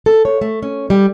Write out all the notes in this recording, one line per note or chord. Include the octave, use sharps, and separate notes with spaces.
A4
C#5
A3
C#4
G3